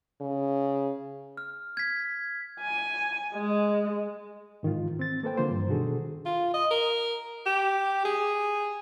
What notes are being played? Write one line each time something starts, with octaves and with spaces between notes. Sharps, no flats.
C#3
F6
G#6 B6
G#5
G#3
G#2 D#3 E3 F4
C4 A6
A#3 A4 B4 C5 G5
D3 F3 A#3 F4 C5
G2 E3
B2 D#3 D4 F#4 G#4 A4
F4
D#5
A#4
G4
G#4